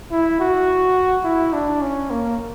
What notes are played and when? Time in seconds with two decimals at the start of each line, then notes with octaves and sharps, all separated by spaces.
0.12 E4
0.40 F#4
1.24 E4
1.54 D4
1.82 C#4
2.10 A#3